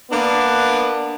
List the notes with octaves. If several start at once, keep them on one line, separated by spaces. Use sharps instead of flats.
A#3 B3 D4